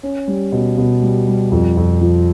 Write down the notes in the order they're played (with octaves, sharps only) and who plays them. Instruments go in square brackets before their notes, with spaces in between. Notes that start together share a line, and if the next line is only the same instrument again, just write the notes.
[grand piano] C#4
G3
B2
B2
G3
G3
F2
F2
F3